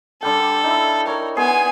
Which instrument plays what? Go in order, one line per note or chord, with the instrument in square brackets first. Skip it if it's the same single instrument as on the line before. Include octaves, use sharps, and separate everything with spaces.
[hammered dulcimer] D3 G3 G5 [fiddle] A4
[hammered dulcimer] D#4 E4
[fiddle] A#4 [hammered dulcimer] C#5
[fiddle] B3 G#5 [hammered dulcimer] G#4 C5